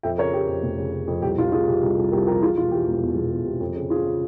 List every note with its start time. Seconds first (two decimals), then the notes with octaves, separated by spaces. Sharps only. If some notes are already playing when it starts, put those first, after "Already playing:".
0.03 F2 E5 G5
0.18 C#3 A#4 C#5
0.33 F2 G4 A#4
0.48 F2
0.63 F1
0.78 C#3
0.92 C#3
1.07 F2
1.22 C2 G4
1.38 C2 F4
1.52 C2 F4 G#4
1.68 C3
1.82 C2
1.97 C2
2.12 C2 G4 A#4
2.26 F3 G4 A#4
2.41 E3 F4 G#4
2.57 E1 F4
2.71 E3 G4
2.87 E1
3.02 E2
3.16 E1
3.31 E2
3.46 C3
3.60 F2
3.76 C#3
3.90 C#3 F4 G#4
4.05 C#3